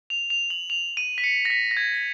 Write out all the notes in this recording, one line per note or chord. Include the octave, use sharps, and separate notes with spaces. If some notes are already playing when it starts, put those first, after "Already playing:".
F7
F7
F#7
F7
D#7
B6
C#7
A#6
B6
A#6
G#6
B6